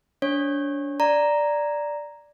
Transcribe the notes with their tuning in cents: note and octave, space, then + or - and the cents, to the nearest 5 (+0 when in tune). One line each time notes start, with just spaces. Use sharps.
D4 -30 C#5 -25
D5 +0 A#5 +0